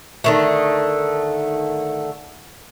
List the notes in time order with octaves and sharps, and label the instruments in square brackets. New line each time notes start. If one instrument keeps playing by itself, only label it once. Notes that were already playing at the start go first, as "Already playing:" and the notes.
[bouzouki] D3 D#3 A3